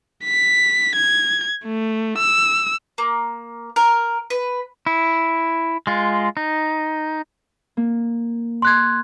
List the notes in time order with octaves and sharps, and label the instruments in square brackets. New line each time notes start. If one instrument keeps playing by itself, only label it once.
[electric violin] B6
G#6
A3
E6
[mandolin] A#3
A#4
B4
[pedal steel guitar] E4
G#3 F4
D#4
[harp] A#3
[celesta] C6 F#6 G#6